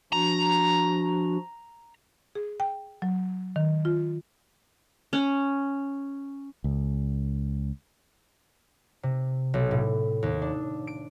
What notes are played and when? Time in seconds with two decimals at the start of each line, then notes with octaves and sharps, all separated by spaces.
0.13 F3 D4 F#4 A#5
2.35 G#4
2.60 G5
3.02 F#3
3.56 D#3
3.85 F4
5.13 C#4
6.64 C#2
9.03 C3
9.54 B1
9.71 A2
10.23 D#2
10.42 D4
10.87 D7